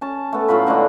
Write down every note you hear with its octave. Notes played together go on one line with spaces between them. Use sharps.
C#4 A5
A3 B3
A2 F#3 F4 B5
A2 D3 G#3 D4